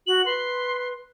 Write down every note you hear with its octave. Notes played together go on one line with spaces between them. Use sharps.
F#4 F#7
B4 C6